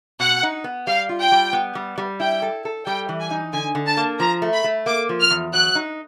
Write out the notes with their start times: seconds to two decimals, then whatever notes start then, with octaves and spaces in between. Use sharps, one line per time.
0.20 B2 F#5
0.43 D#4
0.64 B3
0.87 G3 F5
1.09 F4
1.21 G5
1.32 G3
1.53 B3
1.75 G3
1.98 G3
2.20 E4 G5
2.42 A4
2.65 A4
2.86 G3 G5
3.09 E3
3.20 G#5
3.31 D#4
3.53 D3 G#5
3.75 D3
3.87 A5
3.97 A#3
4.20 F3 A#5
4.42 A3
4.53 B5
4.64 A3
4.86 A#3 D6
5.09 F3
5.20 F6
5.31 E2
5.53 F#3 F#6
5.75 D#4